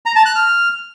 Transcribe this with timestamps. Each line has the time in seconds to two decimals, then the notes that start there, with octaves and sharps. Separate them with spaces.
0.06 A#5
0.16 A5
0.26 F#6
0.35 F6